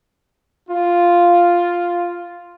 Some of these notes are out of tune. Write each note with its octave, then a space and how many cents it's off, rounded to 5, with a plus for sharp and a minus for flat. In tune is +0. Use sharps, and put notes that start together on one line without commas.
F4 +0